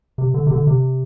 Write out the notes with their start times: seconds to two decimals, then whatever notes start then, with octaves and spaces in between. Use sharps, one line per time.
0.18 C3
0.34 D3
0.47 C3
0.51 D3
0.67 C3